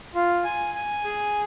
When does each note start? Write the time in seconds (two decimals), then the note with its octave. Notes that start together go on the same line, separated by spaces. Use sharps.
0.15 F4
0.44 G#5
0.75 G#5
1.04 G#4